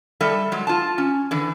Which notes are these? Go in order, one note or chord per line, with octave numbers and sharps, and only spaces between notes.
G3 A4 E5
F#3 G#3
F4 A5
C#4
D3 E3